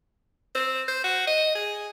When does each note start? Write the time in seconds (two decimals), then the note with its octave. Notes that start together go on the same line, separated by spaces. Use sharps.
0.55 C4
0.88 C5
1.04 F#4
1.27 D#5
1.55 G#4